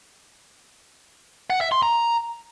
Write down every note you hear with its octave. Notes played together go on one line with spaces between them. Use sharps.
F#5
E5
C6
A#5